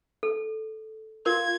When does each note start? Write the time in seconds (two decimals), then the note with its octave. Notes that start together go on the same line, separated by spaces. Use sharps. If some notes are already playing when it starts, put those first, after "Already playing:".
0.23 A4
1.26 F4 A#4 G#6